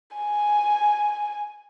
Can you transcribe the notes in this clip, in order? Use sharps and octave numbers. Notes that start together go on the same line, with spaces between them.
G#5